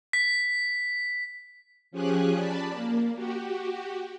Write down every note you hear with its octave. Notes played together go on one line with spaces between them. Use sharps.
B6
F3 C#4 G4 G#4 G#5 F#6
D5 A5 B5
A#3
F#4 G4